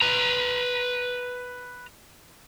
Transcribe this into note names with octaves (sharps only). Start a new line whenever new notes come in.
B4 A#5